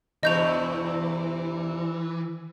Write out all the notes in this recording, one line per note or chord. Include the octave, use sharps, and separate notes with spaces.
E2 G2 C3 E3 D#5 G6 F7